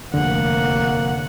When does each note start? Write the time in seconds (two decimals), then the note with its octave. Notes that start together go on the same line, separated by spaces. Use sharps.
0.14 F1 D#2 D3 A#3 F#5